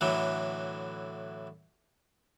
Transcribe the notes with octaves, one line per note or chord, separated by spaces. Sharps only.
A2 D3 E3 F#3